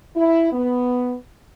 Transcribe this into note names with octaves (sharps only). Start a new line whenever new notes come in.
E4
B3